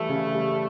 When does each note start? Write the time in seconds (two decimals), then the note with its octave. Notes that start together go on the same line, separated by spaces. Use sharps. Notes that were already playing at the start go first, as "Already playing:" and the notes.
Already playing: E3 G3 A3
0.09 C#3
0.34 G3